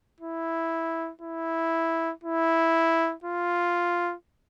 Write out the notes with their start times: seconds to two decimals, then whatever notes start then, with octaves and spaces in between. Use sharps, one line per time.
0.20 E4
1.21 E4
2.23 E4
3.24 F4